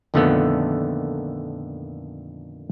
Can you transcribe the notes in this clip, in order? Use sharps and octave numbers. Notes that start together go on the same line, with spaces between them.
F2 A#2 D3 D#3 A3 B3